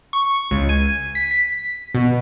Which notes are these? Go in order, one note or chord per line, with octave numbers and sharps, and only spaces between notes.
C#6
C#2
G#5
B6
B6
B2